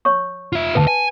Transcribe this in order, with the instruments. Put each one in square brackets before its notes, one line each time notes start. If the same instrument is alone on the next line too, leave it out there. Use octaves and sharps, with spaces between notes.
[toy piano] C#5 C#6
[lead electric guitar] F4 E5
[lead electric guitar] D2 B2 [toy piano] B4 A5
[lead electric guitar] G#5